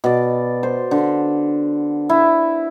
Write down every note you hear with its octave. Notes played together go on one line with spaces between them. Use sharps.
B2 D5
C5
D3
E4